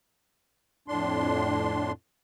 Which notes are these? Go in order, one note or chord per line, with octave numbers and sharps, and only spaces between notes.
F2 A2 D4 C6